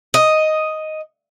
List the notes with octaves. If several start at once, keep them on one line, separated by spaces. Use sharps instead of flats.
D#5